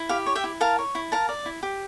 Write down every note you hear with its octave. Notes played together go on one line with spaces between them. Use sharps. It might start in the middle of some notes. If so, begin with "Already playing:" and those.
Already playing: E4
G4 F5
C#5
E5 G5
E4
A#4 F5 A5
C#5
E4
A#4 F5 A5
D5
E4
G4